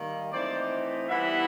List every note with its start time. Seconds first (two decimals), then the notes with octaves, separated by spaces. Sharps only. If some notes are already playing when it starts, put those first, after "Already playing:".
Already playing: D#3 G3 A#3
0.33 E3 A3 C4 D#4 C5 D5
1.09 E3 G3 B3 E4 E5 F#5